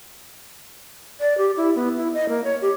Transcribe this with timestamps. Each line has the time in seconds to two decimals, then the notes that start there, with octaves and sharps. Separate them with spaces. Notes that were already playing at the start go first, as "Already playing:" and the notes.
1.20 D5
1.38 G4
1.57 E4
1.76 B3
1.97 E4
2.14 D#5
2.29 A#3
2.44 C#5
2.62 G4